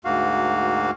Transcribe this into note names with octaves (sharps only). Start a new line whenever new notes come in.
D2 G#2 A#3 F#4 F5